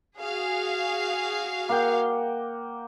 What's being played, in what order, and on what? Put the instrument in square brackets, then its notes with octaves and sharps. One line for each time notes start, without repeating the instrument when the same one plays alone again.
[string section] F#4 G#4 F5
[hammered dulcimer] A#3 F#5 G5